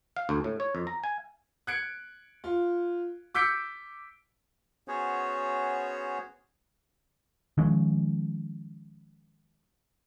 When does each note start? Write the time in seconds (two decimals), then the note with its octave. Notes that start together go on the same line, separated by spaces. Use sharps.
0.16 F5
0.29 D2
0.44 A2
0.60 C#5
0.75 F2
0.87 A#5
1.04 G#5
1.67 F#6 G#6 C#7 D7
2.44 F4
3.34 D6 E6 G6 B6 C#7 D7
4.88 B3 C#4 F#4 G#4 C5 C#5
7.58 D#3 F3 G#3 C#4